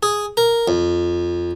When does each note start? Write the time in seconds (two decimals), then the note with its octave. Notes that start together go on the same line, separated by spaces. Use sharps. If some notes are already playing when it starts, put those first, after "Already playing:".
0.03 G#4
0.37 A#4
0.68 F2